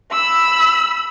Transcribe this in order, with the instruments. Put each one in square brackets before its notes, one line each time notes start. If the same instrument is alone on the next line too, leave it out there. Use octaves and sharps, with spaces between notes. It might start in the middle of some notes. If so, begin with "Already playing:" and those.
[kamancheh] B5 E6